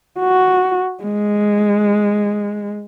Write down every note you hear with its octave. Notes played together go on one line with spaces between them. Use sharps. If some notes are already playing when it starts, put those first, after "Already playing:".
F#4
G#3